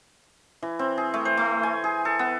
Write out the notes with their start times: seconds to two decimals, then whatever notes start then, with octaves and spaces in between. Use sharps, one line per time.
0.62 E3
0.79 C4
0.98 G#4
1.14 A3
1.25 C5
1.37 A3
1.63 G#5
1.84 G#4
2.05 A4
2.19 B3